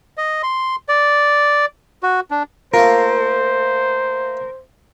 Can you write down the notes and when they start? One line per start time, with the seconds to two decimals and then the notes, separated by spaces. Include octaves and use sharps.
0.17 D#5
0.43 C6
0.89 D5
2.03 F#4
2.31 D4
2.74 A3 A#3 F4 A#4 C5